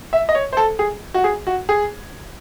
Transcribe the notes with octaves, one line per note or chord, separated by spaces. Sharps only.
E5
D#5
C#5
C5
A4
G#4
F#4
G#4
F#4
G#4